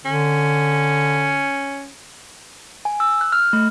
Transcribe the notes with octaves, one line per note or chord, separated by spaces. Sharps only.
D3 C#4
G#5
E6
F#6
F6
A3